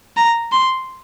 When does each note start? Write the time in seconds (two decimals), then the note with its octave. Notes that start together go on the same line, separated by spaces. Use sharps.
0.17 A#5
0.52 C6